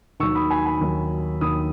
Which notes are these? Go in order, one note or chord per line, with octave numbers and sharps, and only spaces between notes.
D#2 D#3 F#3 C#6 E6
B5 D#6
G#5 B5
G#5 B5
D#2 D#3 F#3
D#2 D#3 F#3 B5 D#6